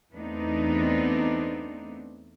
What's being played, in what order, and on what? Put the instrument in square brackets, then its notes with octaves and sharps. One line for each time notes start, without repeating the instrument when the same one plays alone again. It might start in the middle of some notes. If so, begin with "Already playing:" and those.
[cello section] E2 A3 B3 C4 D4 D#4